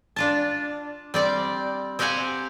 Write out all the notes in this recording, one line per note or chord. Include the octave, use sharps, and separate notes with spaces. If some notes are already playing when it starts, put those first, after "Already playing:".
D4 F4 A5
G3 C4 D5
C4 G4 F5 F#5 G#5 A#5